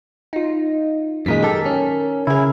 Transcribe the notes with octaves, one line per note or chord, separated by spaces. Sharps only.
D#4 F4
F#2 A#2 D#3 G#3 A#4 B6
G#3 G4 A4 A#4
C#4
C#3 E4 G#4 A#4